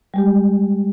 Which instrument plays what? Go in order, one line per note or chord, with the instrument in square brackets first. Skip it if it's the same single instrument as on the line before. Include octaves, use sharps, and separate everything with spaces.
[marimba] G3 G#3 G4